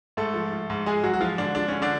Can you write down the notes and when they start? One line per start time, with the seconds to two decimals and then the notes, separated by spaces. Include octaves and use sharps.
0.17 G#2 A3 A4
0.34 F3
0.52 F3
0.70 G#2
0.86 G#2 G#3 G#4
1.03 G#2 F#3 F#4
1.13 F#4
1.21 F3 F4
1.38 G#2 D3 D4
1.55 F3 D4
1.68 D3 C#4
1.82 D3 D4